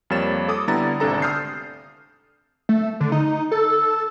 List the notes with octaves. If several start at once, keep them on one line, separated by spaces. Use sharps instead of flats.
F2 G3 A#3 C#5 A6 E7
A4 D6 D#6
D3 G3 B3 E4 A#5 A6
G#1 D2 C3 D4 A4 A#5
D#6 F6 G6 C7
A3
D3
D#4
A4